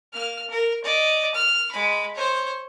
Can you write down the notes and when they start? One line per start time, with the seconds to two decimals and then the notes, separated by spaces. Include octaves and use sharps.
0.13 A#3 F6
0.50 A#4
0.84 D5 D#5
1.34 F6
1.71 G#3 B5
2.14 C5 C#5